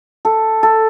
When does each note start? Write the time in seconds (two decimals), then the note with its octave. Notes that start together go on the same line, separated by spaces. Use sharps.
0.25 A4
0.63 A4